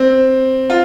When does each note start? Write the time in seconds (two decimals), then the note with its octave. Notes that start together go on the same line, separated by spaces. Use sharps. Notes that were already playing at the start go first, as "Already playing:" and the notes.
Already playing: C4
0.70 F4